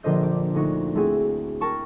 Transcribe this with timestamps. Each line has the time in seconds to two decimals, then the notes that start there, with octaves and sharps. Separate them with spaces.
0.03 A#1 D3 C5 D#5 G6
0.23 D6
0.55 D2 D#4 F#4
0.95 A3 C4 E4 F#4 G#4
1.61 A#4 G5 A5 C#6